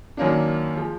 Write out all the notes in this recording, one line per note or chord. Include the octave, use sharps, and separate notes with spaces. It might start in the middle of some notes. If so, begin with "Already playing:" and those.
F#2 D#3 F#3 A#3 D4
F3 G#3